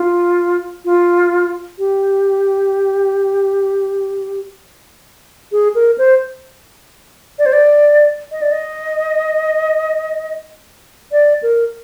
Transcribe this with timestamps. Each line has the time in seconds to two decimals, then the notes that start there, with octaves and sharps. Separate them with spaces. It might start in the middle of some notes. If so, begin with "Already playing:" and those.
Already playing: F4
0.85 F4
1.78 G4
5.52 G#4
5.75 A#4
5.98 C5
7.39 D5
7.46 C5
7.53 D5
8.32 D#5
8.42 D5
8.52 D#5
11.12 D5
11.43 A#4